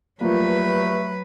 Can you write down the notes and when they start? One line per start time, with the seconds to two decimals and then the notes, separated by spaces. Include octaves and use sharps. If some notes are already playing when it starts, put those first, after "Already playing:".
0.21 G2 F3 F#3 A3 A#3 B4